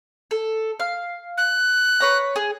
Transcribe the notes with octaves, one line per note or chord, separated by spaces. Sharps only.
A4
F5
F#6
B4 C#5 A#5
G#4